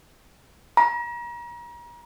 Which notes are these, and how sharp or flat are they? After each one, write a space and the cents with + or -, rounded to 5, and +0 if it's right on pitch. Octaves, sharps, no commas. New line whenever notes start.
A#5 +40